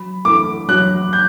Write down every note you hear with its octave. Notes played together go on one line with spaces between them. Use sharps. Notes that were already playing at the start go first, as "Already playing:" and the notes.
Already playing: F#3 B5
A3 E4 A4 D6
F#3 F#6
G6